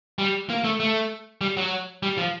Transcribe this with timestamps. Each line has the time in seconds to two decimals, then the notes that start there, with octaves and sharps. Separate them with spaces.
0.18 G3
0.50 A#3
0.64 A3
0.80 A3
1.41 G3
1.57 F#3
2.03 G3
2.18 F3